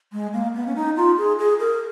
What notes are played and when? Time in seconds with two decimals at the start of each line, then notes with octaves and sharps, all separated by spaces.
0.12 G#3
0.33 A#3
0.54 B3
0.66 C#4
0.75 D#4
0.96 F4
1.17 G#4
1.39 G#4
1.59 A#4